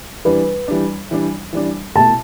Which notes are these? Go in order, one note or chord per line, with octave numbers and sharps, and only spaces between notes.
E3 G3 D4 B4
E3 G3 D4
E3 G3 D4
E3 G3 D4
B2 A3 E4 A5